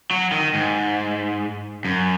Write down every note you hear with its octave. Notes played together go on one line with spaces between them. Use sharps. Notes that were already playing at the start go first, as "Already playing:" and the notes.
F#3
D#3
G#2
F#2